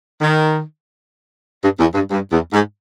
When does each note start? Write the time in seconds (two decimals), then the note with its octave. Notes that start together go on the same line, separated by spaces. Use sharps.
0.21 D#3
1.63 G2
1.79 E2
1.95 G2
2.11 G2
2.32 E2
2.52 G#2